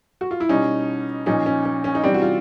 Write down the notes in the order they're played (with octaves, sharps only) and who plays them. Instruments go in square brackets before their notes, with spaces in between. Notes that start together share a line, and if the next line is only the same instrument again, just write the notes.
[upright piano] F#4
F4
E4
B2 G3 C#4 D#4
A#2 F3 C#4 D#4
C#4
C#4
C#4
D#4
C3 E3 G3 C4 D4
F#4
F4